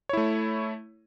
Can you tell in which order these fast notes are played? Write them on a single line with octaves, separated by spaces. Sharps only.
C#5 E4 A3